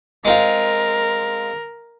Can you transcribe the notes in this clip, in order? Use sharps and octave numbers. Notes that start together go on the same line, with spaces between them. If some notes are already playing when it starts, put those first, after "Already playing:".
G#3 C4 F4 A#4